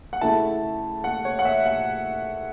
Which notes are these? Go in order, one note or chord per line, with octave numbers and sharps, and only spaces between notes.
F#5
C#3 A3 E4 A5
F#5
C#5
F#5
E5
F#5